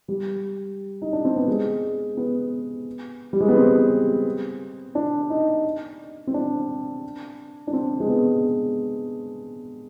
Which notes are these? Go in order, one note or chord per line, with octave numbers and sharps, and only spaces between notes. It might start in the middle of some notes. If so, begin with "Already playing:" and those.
G3
D#4
D4
C4
B3
G#3
B3
G3
G#3
B3
C4
D4
D#4
C4
D4
D4
C4
G#3
B3